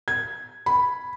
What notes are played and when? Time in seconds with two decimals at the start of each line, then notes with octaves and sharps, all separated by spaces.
0.08 G#6
0.66 B5